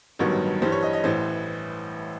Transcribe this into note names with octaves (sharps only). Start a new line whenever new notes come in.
A1 G2 D#3 F#3 B3 C#5
G2 E3 G3 C5
C#5
D#5
D#5
A1 A2 E3 C5